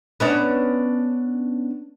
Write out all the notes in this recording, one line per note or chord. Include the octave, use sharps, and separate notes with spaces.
B3 C#4 D4